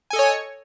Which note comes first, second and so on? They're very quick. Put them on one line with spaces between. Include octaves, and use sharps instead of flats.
G#5 A4 D#5 C#5